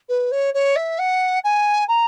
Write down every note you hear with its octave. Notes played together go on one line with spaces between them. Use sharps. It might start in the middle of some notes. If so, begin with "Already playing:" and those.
B4
C#5
C#5
E5
F#5
G#5
A#5